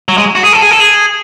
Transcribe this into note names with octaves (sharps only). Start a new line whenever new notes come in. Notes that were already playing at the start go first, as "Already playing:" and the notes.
F#3
G#3
F#4
G#4
A4
G#4
A4
G#4